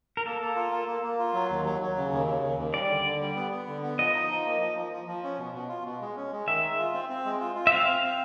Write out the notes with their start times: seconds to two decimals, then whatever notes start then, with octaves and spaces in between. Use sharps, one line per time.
0.17 A#4
0.26 A#3 A4
0.41 A#3
0.56 F4
0.71 A#3
0.87 A#3
1.03 A#3
1.19 F4
1.34 F#3
1.50 D#2
1.65 F#3
1.81 F#3
1.97 C#3
2.12 D#2
2.28 C#3
2.43 D#2
2.58 D#2
2.74 G3 D5
2.89 D3
3.05 D3
3.21 G3
3.36 B3
3.52 B3
3.67 D3
3.83 B3
3.98 F3 D#5
4.15 D#4
4.30 F3
4.46 A#3
4.61 F3
4.76 F3
4.92 F3
5.08 F3
5.24 C#4
5.38 B2
5.54 B2
5.69 F4
5.85 B2
6.01 G#3
6.17 C#4
6.32 G#3
6.47 D#3 E5
6.64 G#3
6.79 F4
6.94 C4
7.09 C4
7.25 G#3
7.40 F4
7.56 F4
7.67 E5
7.72 C4 F5
7.87 C4
8.03 C4